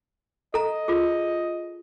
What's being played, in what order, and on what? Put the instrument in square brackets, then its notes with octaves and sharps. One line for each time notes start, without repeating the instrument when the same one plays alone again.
[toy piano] A4 A#5 [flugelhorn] D#5
[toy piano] F4 G#4